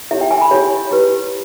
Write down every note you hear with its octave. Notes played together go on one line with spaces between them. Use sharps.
E4 G4 C#5 E5
G5
G#5
B5
E4 G4 C#5
E4 G4 B4